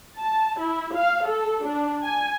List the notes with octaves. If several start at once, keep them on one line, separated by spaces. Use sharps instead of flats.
A5
E4
F5
A4
D4
G#5